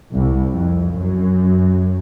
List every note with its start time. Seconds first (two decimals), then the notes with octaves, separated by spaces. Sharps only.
0.14 C2
0.52 F2
0.91 F#2